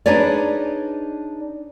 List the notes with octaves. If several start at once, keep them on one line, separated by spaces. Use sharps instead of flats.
D4 D#4 G#4 B4 C#5 D5